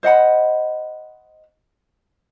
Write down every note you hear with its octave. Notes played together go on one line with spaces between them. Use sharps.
C5 D#5 F#5 B5